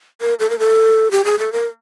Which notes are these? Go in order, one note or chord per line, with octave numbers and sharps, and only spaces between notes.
A#4
A4
A#4
A4
G4
G#4
A4
A#4